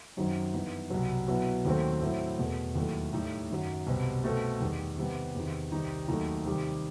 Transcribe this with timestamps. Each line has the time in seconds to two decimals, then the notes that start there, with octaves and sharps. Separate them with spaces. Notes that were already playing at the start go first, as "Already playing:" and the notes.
0.17 F#2 D#3 F#3 C4 D#4
0.54 G2 E3 B3 D#4
0.90 C2 B2 F#3
1.27 B2 F#3 B3 E4
1.65 D#2 D#3 F#3 A3 C4
2.01 A2 F#3 C4 E4
2.39 E2 B2 A3
2.75 D#2 D#3 F#3 A3 E4
3.13 A2 G3 D#4
3.50 F#2 D#3 F#3
3.86 C2 B2 G3 C4
4.23 B2 A3 C4
4.60 E2 D#3 G3
4.98 C3 D#3 G3 B3
5.35 E2 C3 D#3
5.72 C2 C3 D#3 G3 D#4
6.08 D#2 D#3 F#3 A3 D#4
6.45 C3 D#3 G3